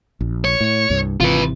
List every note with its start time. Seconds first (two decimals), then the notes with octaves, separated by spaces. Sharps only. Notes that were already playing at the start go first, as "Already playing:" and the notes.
0.21 A#1
0.45 C#5
0.61 A2
0.90 C2 G2
1.20 G#1 C3 E3 F4 B4